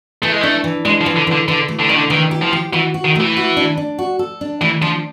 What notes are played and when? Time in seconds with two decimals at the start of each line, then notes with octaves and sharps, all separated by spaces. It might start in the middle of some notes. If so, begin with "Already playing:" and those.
0.22 E3 A3
0.32 G#3
0.41 A3 D4
0.64 E3
0.85 G#3 D4
1.01 F3
1.06 E3
1.16 D3
1.27 E3
1.32 D3
1.48 D3 E3
1.68 A3
1.79 D3
1.89 D#3 D4
1.97 D3
2.10 D#3 E3
2.31 G4
2.42 F3
2.53 G4
2.73 E3 F#4
2.94 F#4
3.05 D#3
3.16 E3 A3
3.37 F#4
3.57 D4
3.77 D4
3.98 F#4
4.19 A4
4.41 D4
4.61 E3 A3
4.82 F3 D4